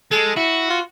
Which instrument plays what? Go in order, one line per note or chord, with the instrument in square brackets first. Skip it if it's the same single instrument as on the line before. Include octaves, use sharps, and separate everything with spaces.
[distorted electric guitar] G#3 [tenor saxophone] A4
[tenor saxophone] E4 [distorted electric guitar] F#4
[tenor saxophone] F4